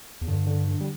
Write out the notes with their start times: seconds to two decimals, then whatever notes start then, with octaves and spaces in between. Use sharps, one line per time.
0.21 E2
0.28 G2 D3
0.47 D3
0.67 D3
0.81 G3